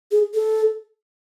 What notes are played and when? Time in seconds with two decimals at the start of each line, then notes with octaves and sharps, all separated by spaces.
0.12 G#4
0.34 A4